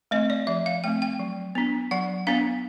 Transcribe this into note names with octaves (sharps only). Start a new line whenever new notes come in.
A3 C4 D#5
D5
F3 E5
F5
A3 C4 G5
G5
F#3
B3 D4
F#3 F#5
B3 D4 F5